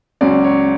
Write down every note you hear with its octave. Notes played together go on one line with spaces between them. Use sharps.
C#2 C#3 F#3 C#4 D5
C#5